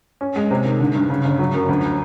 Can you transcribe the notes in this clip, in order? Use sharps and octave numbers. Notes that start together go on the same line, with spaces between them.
C#4
G#3
C3
D#3
D3
G2
C#3
G1
F#3
F#2
D2